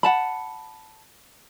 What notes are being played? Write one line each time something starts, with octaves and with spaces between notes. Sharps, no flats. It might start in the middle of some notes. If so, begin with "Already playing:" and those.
F#5 A5 B5